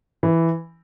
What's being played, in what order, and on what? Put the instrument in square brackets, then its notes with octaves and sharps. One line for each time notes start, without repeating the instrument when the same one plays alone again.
[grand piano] E3